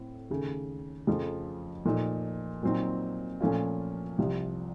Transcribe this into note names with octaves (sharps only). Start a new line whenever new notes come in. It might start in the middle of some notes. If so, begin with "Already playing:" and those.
Already playing: A2 C4
D#2 C#3 A3
F2 C#3 F3 A3
A#2 F3 A3 D#4
A#2 F#3 C4 D#4
A#2 F3 A3 C#4 F4
C2 C3 F3